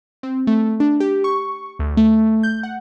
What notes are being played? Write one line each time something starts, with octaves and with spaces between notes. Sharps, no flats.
C4
A3
D4
G4
C#6
D2
A3
G6
F#5